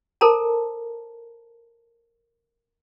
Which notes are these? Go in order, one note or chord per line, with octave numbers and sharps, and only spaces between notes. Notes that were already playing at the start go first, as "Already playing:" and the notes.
A4 A#4 C5 A5 A#5